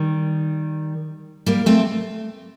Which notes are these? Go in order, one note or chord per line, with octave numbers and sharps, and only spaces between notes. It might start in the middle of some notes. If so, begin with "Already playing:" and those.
Already playing: D#3 G3
G3 A#3
A3 C4